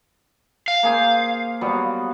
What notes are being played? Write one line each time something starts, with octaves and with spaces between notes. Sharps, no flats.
F5
A#3 G#4 C5
F#3 G3 B3